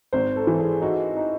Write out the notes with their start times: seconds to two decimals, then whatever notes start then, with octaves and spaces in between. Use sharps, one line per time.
0.13 G#1 C5
0.36 A4
0.47 E3
0.60 G#4
0.82 D#4 F#4
1.17 D#4